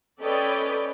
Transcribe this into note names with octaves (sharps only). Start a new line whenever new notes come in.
C#4 A4 B4 D5 D#5 G5